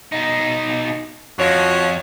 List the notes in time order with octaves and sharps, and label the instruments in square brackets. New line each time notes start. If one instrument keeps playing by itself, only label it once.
[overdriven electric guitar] B2 D#4
[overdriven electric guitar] F2 [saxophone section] F3 F#4 C#5